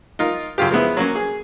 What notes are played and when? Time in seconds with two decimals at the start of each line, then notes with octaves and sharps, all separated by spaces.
0.19 D#4 F4 A#4
0.58 F#2 C#3 F4 G4
0.71 F3 G#3 B3 E4
0.97 F#3 A#3 C#4
1.16 G#4